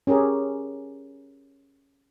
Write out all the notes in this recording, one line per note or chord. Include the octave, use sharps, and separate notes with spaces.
C#4 G4 G#4 A#4